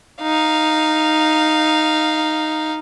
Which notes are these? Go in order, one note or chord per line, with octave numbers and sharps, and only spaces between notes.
D#4 F5